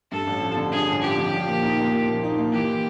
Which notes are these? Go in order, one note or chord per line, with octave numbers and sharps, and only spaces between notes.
G2 A4
A1
F3
D3
G2 G#4
A1
F3 G4
D3
F3
A#2
D#4
A#3
F3
A#2
D#4
A#3
E3 G4